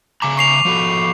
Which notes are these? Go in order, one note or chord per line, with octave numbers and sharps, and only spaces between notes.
C#3 G#5 A#5 D6
C#6 C7 F7
F3 F#4 A4